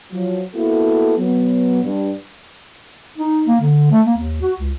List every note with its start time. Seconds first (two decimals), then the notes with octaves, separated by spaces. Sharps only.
0.11 F3 F#3
0.54 A#3 B3 E4 F#4 A4
1.17 F#3 B3
1.83 G2
3.18 D#4
3.48 A#3
3.61 D3
3.91 A3
4.06 A#3
4.18 D#2
4.41 F#4
4.59 C#2